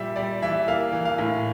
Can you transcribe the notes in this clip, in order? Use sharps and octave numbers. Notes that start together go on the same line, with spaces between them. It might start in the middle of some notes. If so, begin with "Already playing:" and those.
Already playing: A#2 G3 E5
G3 D5
E3 E5
A#3 F5
E3
F5
A2